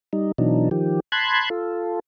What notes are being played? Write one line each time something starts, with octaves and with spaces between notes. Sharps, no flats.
G3 D#4
B2 E3 F#3 D4 D#4
D#3 F3 G4
A5 B5 C6 F#6 G#6
F4 A4